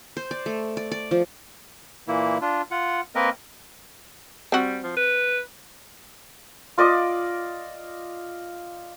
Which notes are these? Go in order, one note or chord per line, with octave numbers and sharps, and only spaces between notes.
C5
D5
A3
D5
D5
F3
A#2 E3 A#3 E4
D4 F4
F4 F#5
A#3 C4 A#4 B4 D#5
G3 C4 F#4
F3
B4
F4 D5 D#5 D6